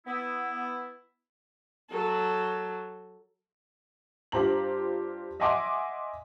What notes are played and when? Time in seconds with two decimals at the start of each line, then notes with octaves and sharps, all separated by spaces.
0.07 B3 E4
1.90 F#3 A4
4.32 G2 F4 G4 C5 A#5 F#7
5.40 D#5 E5 F#5 G#5 C6 D6